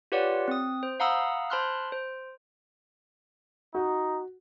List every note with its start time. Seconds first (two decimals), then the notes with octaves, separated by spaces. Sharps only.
0.12 F4 G4 B4 C#5 D5 F#5
0.48 C4 D#6
0.83 C5
1.00 F5 F#5 A#5 B5 D#6 E6
1.50 C5 A5 B5 C6 F6 F#6
1.92 C5
3.75 D#4 F#4